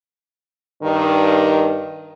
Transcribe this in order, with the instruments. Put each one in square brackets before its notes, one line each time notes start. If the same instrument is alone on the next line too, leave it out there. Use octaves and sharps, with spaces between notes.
[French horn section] G2 D#3